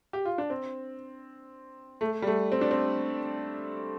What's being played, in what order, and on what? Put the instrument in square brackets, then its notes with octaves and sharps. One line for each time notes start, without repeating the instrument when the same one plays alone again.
[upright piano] G4
F4
D4
C4
A3
G3
A3
C4
D4
C4